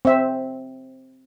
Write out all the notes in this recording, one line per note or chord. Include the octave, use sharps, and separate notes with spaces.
C4 E5